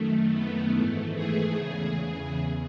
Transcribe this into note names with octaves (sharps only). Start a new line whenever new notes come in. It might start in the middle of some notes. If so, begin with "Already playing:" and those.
Already playing: F#2 D#3 A3
B3
G#2 E3 A3
G#4
E2 C#3 E3 G#4
G#4
E2